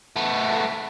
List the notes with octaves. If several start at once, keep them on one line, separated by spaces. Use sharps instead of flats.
A3 B3